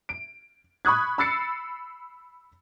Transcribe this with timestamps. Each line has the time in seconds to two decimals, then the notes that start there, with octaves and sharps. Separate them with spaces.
0.09 D7
0.85 B5 C#6 D#6 F#6 G#6
1.18 B5 E6 A6 C7 C#7